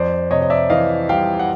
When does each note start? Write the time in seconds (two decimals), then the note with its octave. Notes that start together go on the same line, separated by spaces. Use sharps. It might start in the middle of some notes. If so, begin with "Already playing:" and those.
Already playing: F2 C5 D5
0.31 C3 C#5 D#5
0.42 D#5
0.50 D5 E5
0.70 E3 D#5 F5
1.09 G3 F5 G5
1.39 F#5